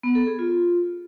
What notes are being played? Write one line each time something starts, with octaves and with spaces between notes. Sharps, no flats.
B3
A4
G#4
F4